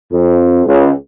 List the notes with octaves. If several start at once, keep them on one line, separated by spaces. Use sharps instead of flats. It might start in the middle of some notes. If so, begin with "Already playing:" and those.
F2
C#2